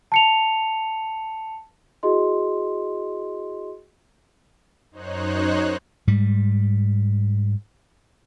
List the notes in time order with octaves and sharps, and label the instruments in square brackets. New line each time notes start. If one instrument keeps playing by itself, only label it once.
[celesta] A5 C#7 F7
E4 F#4 G#4 D#5 C6
[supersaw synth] F#2 D#4 C5 C#5 F#6
[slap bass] G#2 G3